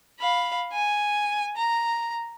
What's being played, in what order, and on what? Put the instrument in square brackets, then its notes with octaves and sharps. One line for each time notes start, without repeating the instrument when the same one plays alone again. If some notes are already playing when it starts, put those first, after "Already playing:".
[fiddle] F5 B5
G#5
A#5